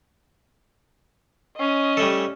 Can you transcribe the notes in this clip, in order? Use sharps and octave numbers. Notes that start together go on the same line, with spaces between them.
C#4 D#5
G3 A3 A4